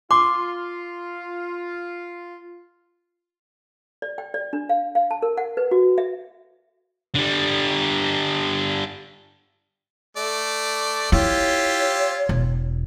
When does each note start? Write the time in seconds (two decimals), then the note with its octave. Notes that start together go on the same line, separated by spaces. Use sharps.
0.11 F4 C6 D6
4.02 D5
4.18 G5
4.34 D5
4.53 D4
4.69 F5
4.95 F5
5.11 A5
5.22 A#4
5.37 F#5
5.57 B4
5.71 F#4
5.98 E5
7.15 D3 G3
10.17 A3 D5
11.12 E4 F4 G4 C#5 E5
12.29 E1